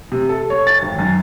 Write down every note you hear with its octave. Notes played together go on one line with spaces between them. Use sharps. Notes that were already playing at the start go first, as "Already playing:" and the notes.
C3
A4
C#5
A6
G#1
F#2